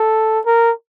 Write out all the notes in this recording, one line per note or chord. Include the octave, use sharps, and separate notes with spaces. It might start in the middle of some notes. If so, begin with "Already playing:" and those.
Already playing: A4
A#4